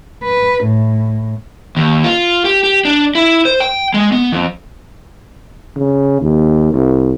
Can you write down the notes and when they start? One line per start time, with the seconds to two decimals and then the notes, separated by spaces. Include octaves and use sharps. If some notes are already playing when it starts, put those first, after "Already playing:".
0.24 B4
0.64 A2
1.77 D#2
2.04 F4
2.45 G4
2.64 G4
2.85 D4
3.15 E4
3.45 C5
3.60 G5
3.94 G#3
4.12 B3
4.32 F2
5.76 C#3
6.21 D#2
6.74 C2